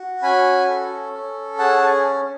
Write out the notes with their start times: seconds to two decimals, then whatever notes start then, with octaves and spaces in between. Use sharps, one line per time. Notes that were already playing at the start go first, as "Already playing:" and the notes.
Already playing: F#4
0.22 C#4 G#5 B5
0.68 A4
1.13 C#4
1.59 G#4 F#5 A5